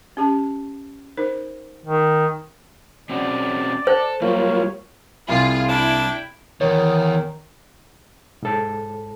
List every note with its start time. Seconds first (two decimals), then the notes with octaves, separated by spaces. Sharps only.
0.17 C#4 G4 A5
1.17 D#4 A#4 C5
1.86 D#3
3.09 C4 C#4 F#4 D5
3.87 A4 C5
4.22 F#3 G3 A#3 F4 C#5
5.29 C2 F4 G#4
5.69 D4 E4 G5
6.61 E2 D#3 C#5
8.43 G#2 A4